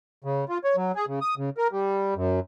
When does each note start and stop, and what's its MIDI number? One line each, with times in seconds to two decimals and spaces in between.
0.24 0.45 49
0.49 0.58 65
0.64 0.76 73
0.77 0.92 54
0.95 1.05 68
1.08 1.19 49
1.21 1.35 87
1.38 1.50 49
1.57 1.68 70
1.72 2.14 55
2.16 2.40 42